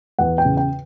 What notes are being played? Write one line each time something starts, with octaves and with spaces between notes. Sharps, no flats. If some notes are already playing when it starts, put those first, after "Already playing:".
E2 F#5
G5
C#3
G5